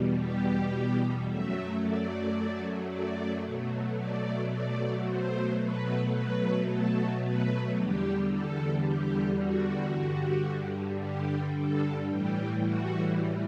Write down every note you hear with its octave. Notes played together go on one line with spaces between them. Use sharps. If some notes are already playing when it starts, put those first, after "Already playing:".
Already playing: E2 B2 G3
G4
F#2 F#3 A3 E5
D5
D5
B2 F#3 A3
D5
D5
C5
B2 F#3 A3 B4
B4
A4
B4
E2 D3 G3 G4
A4
G4
F#4
G2 D3 G3
G4
A4
A2 E3 G3 G4
F#4